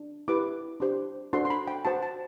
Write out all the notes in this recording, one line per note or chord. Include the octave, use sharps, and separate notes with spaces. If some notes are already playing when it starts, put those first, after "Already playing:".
Already playing: D4
E4 G4 B4 D6
D4 G4 C5
D4 F#4 A4 C5 C6
C6
B5
G5
F#4 C5 A5
A5